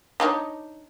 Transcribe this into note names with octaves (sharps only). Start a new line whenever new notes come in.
D4 D#4 C#5